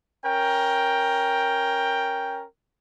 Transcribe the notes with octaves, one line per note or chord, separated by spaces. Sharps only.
C#4 A#4 G5